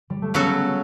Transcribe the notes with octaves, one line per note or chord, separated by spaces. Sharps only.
G3
A3
C#3 F#3 B3 C#4 F#4 A4